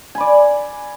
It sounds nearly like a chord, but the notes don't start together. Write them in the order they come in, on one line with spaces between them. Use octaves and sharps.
G#5 B5 D5